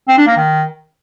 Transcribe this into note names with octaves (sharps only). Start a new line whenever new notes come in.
C4
D4
A#3
D#3